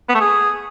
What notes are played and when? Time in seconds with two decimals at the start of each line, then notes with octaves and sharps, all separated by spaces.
0.09 B3
0.15 A3
0.21 G#4